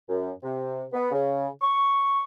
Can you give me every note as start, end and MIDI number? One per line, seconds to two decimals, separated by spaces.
0.09 0.31 42
0.43 0.84 48
0.93 1.10 59
1.12 1.47 49
1.61 2.22 85